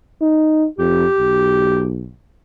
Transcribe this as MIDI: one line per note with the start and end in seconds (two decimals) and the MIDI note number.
0.21 0.67 63
0.79 1.06 41
0.79 1.85 67
1.19 2.15 35